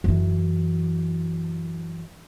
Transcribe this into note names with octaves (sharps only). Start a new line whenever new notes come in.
F#2 E3